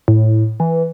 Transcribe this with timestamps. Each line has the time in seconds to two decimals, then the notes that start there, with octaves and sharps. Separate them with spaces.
0.08 A2
0.60 E3